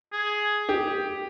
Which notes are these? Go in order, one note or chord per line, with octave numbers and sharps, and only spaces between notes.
G#4
G4